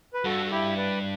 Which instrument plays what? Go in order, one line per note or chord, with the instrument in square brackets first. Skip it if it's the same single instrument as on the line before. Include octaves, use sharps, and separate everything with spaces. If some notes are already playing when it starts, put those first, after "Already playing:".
[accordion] B4
[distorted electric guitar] G2 [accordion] F#4 A4
[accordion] A4
E4 G4
B4 D5